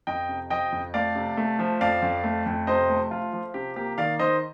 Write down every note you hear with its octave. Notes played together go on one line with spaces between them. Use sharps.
F2 D#5 G5
C3
F3 D#5 G5
F2
A3 D5 F5
C3
A3
F3
F2 D5 F5
F2
A3
F2
C3 C5 D#5
A3
F3 F4
F3
C3 G4
A#3 G4
D#3 D5 F5
D#3 C5 D#5